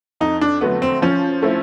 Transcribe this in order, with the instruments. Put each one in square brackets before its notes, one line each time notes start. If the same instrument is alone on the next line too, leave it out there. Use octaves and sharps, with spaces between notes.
[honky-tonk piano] F2 [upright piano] D#4
[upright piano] D4
[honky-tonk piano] D3 F#3 A3 [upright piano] B3
[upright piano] C4
[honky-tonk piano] F3 [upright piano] C#4
[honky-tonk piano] A3 C4 E4